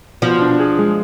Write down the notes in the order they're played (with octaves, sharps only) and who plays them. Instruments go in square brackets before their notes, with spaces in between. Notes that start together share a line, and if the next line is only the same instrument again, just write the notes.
[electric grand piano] B2 [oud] F3
[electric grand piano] D4
G#4
G#3